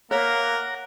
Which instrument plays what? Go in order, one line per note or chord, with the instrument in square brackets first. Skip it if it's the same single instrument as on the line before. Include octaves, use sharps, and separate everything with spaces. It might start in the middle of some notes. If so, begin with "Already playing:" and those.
[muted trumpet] A#3 [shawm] A#4 [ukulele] C#5 E5 [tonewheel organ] F#5 A#5